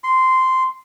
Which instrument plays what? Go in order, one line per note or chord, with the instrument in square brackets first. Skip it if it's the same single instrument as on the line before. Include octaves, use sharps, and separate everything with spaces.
[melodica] C6